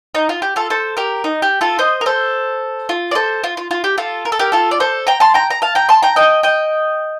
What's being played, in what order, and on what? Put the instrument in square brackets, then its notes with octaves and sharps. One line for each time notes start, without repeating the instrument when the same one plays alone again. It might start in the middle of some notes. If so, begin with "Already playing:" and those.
[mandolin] D#4
F4
G4
F4 A4
A4 C5
G4 A#4
D#4
G4
F4 A4
C5 D#5
A#4
A4 C5
F4
D5
A4 C5
F4
F4
F4
G4
F4 A4
A#4
A4
G4 A#4
F4 A4
D5
A4 C5
G5 A#5
A5 C6
G5 A#5
A#5
F5 A5
G5 A#5
A5 C6
G5 A#5
D#5 G5
D#5 G5